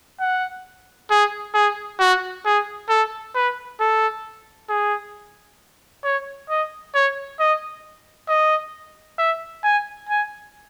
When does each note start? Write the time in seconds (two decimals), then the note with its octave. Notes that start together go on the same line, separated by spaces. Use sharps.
0.20 F#5
1.11 G#4
1.54 G#4
2.00 F#4
2.45 G#4
2.89 A4
3.35 B4
3.80 A4
4.69 G#4
6.04 C#5
6.50 D#5
6.95 C#5
7.40 D#5
8.29 D#5
9.19 E5
9.64 G#5
10.09 G#5